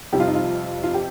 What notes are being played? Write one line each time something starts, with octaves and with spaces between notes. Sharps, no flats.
F2 C3 G3 G4
F4
D#4
F4
F4
G4